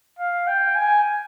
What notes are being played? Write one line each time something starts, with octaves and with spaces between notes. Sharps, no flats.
F5
G5
G#5